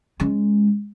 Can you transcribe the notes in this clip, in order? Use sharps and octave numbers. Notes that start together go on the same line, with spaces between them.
G#3 C#4